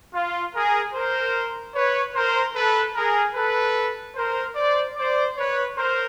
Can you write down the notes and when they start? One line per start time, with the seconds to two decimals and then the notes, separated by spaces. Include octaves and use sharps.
0.14 F4
0.54 G#4 A#4
0.94 A#4 C5
1.75 B4 C#5
2.15 A#4 C5
2.56 A4 B4
2.96 G#4 A#4
3.36 A4 B4
4.16 A#4 C5
4.56 C5 D5
4.97 C5 D5
5.37 B4 C#5
5.77 A#4 C5